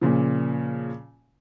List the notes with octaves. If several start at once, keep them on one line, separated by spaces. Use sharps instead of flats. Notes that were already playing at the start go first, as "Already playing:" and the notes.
A#2 C#3 F3